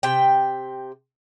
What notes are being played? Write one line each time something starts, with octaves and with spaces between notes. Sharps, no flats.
C3 G5